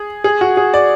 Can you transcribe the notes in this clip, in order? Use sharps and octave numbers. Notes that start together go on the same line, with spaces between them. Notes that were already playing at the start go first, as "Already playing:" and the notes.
Already playing: G#4
G#4
F#4
G#4
D5